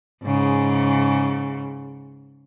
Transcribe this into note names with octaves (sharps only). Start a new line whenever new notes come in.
G#2 C#3